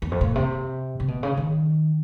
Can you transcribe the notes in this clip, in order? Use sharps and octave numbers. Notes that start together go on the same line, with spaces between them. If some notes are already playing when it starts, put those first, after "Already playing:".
E2
F2
A#2
C3
C3
B2
C#3
D#3